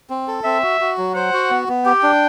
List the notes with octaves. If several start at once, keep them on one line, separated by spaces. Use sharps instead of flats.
C4
A4
C4 E5
F#4
F#4
F#3
C5 F#5
F#4
B3
B3
G4 G5
D4